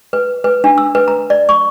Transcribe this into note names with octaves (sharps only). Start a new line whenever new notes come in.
B4
B4
D4
E6
B4
A#5
D5
C#6